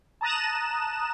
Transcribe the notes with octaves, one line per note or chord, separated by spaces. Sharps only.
A5 A#5 D#6 F#6 E7